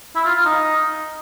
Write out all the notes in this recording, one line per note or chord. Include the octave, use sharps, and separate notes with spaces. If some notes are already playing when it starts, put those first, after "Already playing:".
E4
F4
F5
D#4